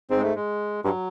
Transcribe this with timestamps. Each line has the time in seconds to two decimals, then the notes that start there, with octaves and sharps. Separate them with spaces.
0.10 G#2 C4
0.18 G#3
0.22 A3
0.36 G#3
0.84 G2 F#3